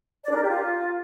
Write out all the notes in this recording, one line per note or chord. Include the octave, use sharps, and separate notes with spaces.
D5
D4
A#4
G4
F4